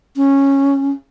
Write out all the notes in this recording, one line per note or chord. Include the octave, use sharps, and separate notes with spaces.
C#4